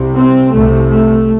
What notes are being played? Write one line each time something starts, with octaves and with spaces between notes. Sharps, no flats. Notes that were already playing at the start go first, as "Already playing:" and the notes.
Already playing: C2 C3
C4
C2 C3 A3
A3